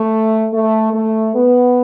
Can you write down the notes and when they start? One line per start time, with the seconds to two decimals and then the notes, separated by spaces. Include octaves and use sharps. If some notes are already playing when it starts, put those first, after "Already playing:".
Already playing: A3
0.53 A3
0.93 A3
1.34 B3